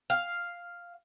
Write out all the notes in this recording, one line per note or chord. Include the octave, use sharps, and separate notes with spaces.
F5